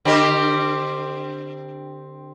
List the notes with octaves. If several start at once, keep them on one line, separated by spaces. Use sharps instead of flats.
D3 C4 G4